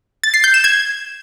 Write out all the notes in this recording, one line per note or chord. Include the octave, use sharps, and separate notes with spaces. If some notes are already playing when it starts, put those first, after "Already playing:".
A6
C7
G6
E7
G#6